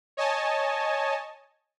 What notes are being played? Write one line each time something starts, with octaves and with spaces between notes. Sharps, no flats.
C#5 D#5 G#5 A5